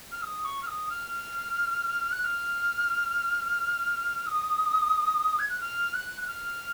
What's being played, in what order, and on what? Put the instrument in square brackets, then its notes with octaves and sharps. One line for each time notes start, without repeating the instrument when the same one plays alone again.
[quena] F6
D#6
C#6
F6
D#6
F6
F#6
F6
D#6
G#6
F#6
F6
F#6
F#6
F6